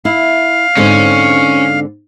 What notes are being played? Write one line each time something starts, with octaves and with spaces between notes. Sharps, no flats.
E4 F5
G#2 D3 C4 C#4